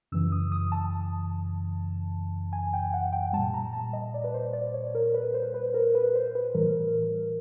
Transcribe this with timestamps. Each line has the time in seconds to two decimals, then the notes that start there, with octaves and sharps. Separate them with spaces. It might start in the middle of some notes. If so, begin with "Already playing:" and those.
0.12 F#2 C#3 E3 E6
0.32 D#6
0.52 D#6
0.72 A5
2.53 G#5
2.73 G5
2.94 F#5
3.13 G5
3.33 A#2 G3 A5
3.54 A#5
3.73 A5
3.93 D#5
4.14 D5
4.24 B4
4.34 C5
4.53 D5
4.74 C#5
4.95 A#4
5.14 B4
5.34 C5
5.54 B4
5.74 A#4
5.95 B4
6.15 C5
6.35 B4
6.55 A2 E3 G3 A#4